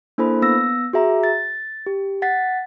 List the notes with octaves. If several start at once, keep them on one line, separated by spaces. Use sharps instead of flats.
A#3 D4 E4 A4 C5 B5
B3 E6 A#6
F#4 G#4 E5 A#5
A6
G4
F#5 A6 B6